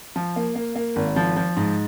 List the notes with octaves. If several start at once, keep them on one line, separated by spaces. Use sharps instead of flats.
F3
A#3
A#3
A#3
G#1
F3
F3
G#2